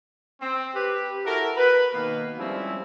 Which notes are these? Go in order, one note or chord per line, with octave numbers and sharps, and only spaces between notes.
C4
G4 B4
E4 F#4 A4 A#4
B4
B2 D#3 A#3 B3
F3 G3 G#3 C4 C#4 E4